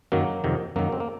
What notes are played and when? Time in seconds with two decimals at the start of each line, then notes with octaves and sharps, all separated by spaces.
0.12 F#2 D#3 F#3 A#3
0.44 F2 C3 D#3
0.76 F#2 D#3 F#3 A#3
0.92 C4
1.00 A#3